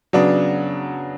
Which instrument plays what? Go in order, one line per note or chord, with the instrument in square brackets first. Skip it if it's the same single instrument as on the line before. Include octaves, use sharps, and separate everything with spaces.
[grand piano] C#3 F#3 B3 D4